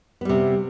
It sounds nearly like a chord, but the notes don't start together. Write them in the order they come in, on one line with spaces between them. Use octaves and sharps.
B3 G3 C3